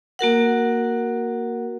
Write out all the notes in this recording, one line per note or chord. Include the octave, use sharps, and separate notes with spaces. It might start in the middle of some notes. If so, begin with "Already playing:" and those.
A#3 F#4 A#4 F#5